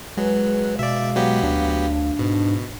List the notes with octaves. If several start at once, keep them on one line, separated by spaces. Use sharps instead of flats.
F#3 G#3 B4
B2 D5 E5 F5
F#3 B3 G4
D2 D4
G#2 B2